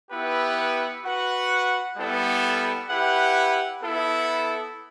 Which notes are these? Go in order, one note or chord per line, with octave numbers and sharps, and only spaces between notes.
B3 E4 G4 B4
F#4 B4 F#5
G3 B3 E4 A4
E4 G4 B4 F#5
B3 E4 A4